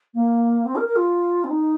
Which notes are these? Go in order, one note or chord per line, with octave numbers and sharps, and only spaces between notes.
A#3
C4
A#4
A#4
F4
C4
D#4